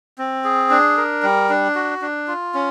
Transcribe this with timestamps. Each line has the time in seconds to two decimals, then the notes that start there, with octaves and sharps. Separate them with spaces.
0.18 C4
0.44 G#4
0.70 D4
0.97 A#4
1.23 G3
1.50 D4
1.75 F#4
2.02 D4
2.28 F4
2.54 C#4